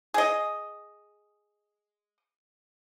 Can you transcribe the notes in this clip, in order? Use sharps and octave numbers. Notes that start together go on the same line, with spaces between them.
G#4 D#5